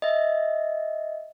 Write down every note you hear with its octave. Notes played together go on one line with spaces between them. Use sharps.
D#5 E5